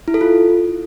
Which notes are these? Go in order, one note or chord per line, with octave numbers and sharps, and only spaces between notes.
E4
A4
F4